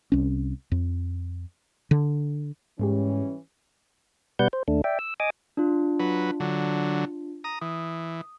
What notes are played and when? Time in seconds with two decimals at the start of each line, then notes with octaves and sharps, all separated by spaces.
0.12 C2 C#4
0.72 F2
1.91 D3
2.80 G#2 E3 G3 G#3 C#4 G4
4.39 B2 G3 B4 D5 F#5 G6
4.53 C5
4.68 D#2 A3 D4
4.84 D5 E5 G5
4.99 E6
5.20 D#5 G#5 D6 D#6
5.57 D4 F4
6.00 F#3 B4
6.40 D3 F#3
7.44 A#5 D#6
7.61 E3 D#6